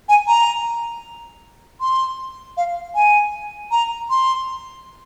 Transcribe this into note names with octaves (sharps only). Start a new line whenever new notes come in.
G#5
A#5
C6
F5
G#5
A#5
C6